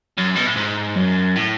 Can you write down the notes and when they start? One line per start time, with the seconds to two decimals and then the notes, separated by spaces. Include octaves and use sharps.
0.18 F#2
0.37 B2
0.47 A2
0.57 G#2
0.97 F#2
1.36 A2